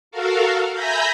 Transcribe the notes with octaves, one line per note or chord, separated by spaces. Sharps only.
F#4 A4 A#4 F5
E5 G#5 A#5 B5 G6 A#6